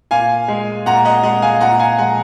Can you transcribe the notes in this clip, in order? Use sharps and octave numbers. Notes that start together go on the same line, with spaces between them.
A#2 F5 G#5
G#3
A#2 F#5 A#5
D#5 F#5
G#3 D#5 F#5
F5 G#5
A#2 F#5 A#5
F5 G#5
F3 G#3 F#5 A#5